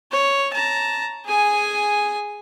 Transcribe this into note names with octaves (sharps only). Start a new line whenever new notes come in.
C#5
A5 A#5
G#4 G#5